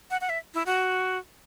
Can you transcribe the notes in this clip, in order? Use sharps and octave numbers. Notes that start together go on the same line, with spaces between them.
F#5
F#5
E5
E4
F#4